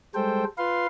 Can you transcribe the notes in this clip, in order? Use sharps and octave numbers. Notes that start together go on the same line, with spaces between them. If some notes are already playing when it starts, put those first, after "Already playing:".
G3 G#3 A4 C5 G5
F4 B4 F5 C6